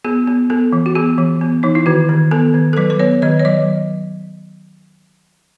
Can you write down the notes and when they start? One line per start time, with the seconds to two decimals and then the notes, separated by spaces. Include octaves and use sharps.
0.04 B3 G#4
0.28 B3
0.50 B3 A4
0.73 E3
0.86 F#4
0.95 B3 G#4
1.18 E3
1.41 B3
1.63 E3 D#4
1.75 E4
1.86 D#3 F#4
2.09 D#3
2.31 B3 A4
2.54 D#3
2.73 A4
2.77 F#3 B4
2.90 B4
3.00 B3 C#5
3.22 D#3 D#5
3.39 C#5
3.45 F#3 D#5